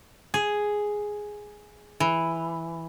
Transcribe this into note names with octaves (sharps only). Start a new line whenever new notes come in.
G#4
E3